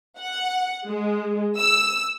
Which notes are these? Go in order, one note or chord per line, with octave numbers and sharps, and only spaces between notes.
F#5
G#3
E6